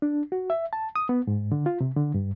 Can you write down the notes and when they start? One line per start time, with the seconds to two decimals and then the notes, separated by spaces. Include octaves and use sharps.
0.02 D4
0.32 F#4
0.50 E5
0.73 A5
0.96 D#6
1.09 B3
1.27 G#2
1.52 D3
1.66 F4
1.81 C3
1.97 D3
2.14 G2